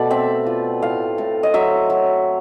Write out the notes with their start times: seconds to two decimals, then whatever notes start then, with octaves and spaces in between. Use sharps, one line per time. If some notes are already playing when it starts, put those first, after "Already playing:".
Already playing: B2 A3 D5
0.10 C4 E5
0.47 F4
0.82 A2 F5
1.18 A2
1.43 D#5
1.54 F#3 E5
1.90 F#3